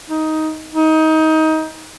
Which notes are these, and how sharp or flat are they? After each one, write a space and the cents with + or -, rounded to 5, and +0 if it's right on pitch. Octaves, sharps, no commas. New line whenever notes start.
D#4 +10
D#4 +20